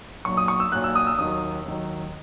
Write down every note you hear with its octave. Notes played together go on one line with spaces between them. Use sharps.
B1 A#2 F#3 C#6
D#6
C#6
E6
B1 A#2 F#3 F#6
E6
D#6
E6
D#2 D#3 F#3 D#6
D#2 D#3 F#3